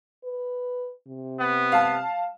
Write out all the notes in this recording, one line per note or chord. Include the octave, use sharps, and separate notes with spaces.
B4
C3
B3
F5 A5